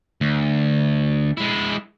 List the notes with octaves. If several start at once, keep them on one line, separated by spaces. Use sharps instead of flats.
D2
G#3 E4